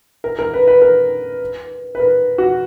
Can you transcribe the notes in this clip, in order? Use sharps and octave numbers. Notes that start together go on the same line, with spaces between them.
A#4
A#4
B4
B4
A#4
B4
A#4
F#4